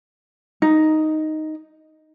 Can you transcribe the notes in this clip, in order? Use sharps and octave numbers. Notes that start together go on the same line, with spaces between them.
D#4